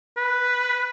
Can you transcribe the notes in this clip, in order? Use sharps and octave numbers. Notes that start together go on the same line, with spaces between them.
B4